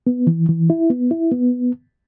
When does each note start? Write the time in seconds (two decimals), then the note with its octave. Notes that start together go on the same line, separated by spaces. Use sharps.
0.07 B3
0.27 E3
0.49 E3
0.70 E4
0.90 B3
1.11 E4
1.32 B3